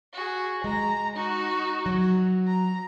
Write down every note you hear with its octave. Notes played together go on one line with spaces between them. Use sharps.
F#4 G#4
G#3 A#5
D#4 F#4
F#3
A#5